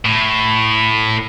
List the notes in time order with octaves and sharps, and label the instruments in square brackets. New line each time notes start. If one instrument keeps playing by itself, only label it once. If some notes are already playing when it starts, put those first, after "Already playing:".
[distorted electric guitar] A2